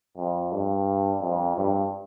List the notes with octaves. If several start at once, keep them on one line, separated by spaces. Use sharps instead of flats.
F2
G2
F2
G2